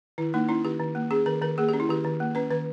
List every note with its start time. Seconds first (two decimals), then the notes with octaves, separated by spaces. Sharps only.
0.18 D#3 E4
0.34 A#3 D#4
0.49 C#4 E4
0.65 D#3 G4
0.80 D#3
0.95 A#3
1.11 C#4 G#4
1.26 D#3 A#4
1.41 D#3 A#4
1.58 A#3 G#4
1.69 C#4 G4
1.80 E4
1.89 D#3 G4
2.04 D#3
2.20 A#3
2.35 C#4 B4
2.51 D#3 B4